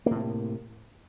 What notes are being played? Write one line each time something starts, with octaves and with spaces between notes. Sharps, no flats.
A2 C3 A#3